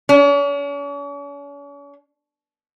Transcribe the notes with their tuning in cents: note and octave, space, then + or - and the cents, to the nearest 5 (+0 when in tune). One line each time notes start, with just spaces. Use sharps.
C#4 +45